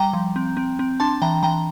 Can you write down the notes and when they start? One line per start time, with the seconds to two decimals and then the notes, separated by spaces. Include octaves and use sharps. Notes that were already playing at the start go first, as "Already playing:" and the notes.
Already playing: G3 G5 A#5
0.13 F3
0.36 C4
0.57 C4
0.79 C4
1.00 D4 A5 C6
1.22 E3 G5 A#5
1.43 E3 G5 A#5